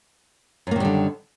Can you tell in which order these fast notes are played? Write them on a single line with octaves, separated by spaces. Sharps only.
F#2 A#3 D#3 G3 D3